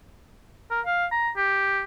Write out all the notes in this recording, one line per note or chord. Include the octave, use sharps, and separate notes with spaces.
A#4
F5
A#5
G4